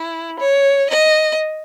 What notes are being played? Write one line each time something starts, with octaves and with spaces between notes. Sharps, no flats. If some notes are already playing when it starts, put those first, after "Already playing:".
Already playing: E4
C#5
D#5